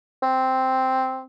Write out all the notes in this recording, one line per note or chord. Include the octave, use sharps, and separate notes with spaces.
C4